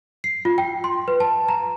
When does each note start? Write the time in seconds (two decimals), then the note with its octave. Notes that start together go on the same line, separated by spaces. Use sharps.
0.24 C7
0.45 F4
0.58 G5
0.84 C6
1.08 B4
1.20 A5
1.49 A#5